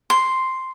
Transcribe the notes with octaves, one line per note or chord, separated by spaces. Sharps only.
C6